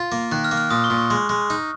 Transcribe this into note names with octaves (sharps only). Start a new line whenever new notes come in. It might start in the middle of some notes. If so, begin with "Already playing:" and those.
Already playing: F4
A#3
D#3 F#6
F6
A#3
F6
A#2 D#6
C#6
A#2
C#6
G#3
G#3
D#4